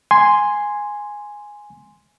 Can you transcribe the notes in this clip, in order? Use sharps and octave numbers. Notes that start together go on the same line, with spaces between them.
G#5 C6